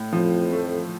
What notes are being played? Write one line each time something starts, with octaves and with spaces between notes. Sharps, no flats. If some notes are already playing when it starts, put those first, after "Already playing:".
Already playing: A2
F2 F3
A3